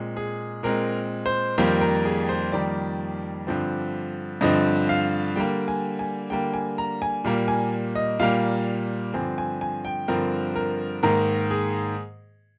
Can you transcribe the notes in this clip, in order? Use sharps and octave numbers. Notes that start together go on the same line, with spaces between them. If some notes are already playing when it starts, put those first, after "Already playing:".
Already playing: A#2 G#3 C4
G#4
A#2 G#3 C4 A#4
C5
F2 D#3 G3 A#3 C5
A#4
G#4
C5
F2 D#3 G3 A#3 D5
G2 D3 F3 C4
G2 D3 F3 C4 D#5
F5
D3 G3 A#3 G5
G#5
G#5
D3 G3 A#3 G5
G#5
A#5
G#5
A#2 G3 A#3
G#5
D#5
A#2 G3 A#3 F5
G2 D3 F3 C4 G#5
G#5
G#5
G5
G2 D3 F3 C4 A#4
A#4
G#2 D#3 A#3 A#4
G#4